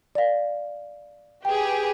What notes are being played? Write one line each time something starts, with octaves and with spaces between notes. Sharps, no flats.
D5 F5
G4 G#4 B4 G5